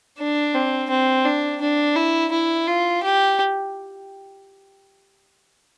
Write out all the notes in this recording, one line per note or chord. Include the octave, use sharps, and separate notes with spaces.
D4
C4
C4
D4
D4
E4
E4
F4
G4